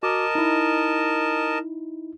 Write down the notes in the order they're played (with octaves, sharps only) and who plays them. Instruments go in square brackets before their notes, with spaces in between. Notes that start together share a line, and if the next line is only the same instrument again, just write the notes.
[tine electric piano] F#4 D6 [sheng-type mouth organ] A#4 D#5 A5
[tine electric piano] D#4 E4